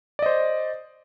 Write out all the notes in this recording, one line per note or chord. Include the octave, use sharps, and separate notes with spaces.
C5 D5 D#5